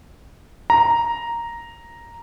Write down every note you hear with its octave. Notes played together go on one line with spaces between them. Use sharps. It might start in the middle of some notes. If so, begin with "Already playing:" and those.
A#5